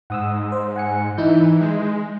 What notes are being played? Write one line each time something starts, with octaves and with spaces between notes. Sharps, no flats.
G#2 F#5 D#6 E6
C5
F#5 G#5 C#7
E3 D#4 E4 G6
G#3